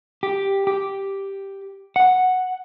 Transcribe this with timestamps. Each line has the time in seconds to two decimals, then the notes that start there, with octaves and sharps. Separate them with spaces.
0.23 G4
0.67 G4
1.96 F#5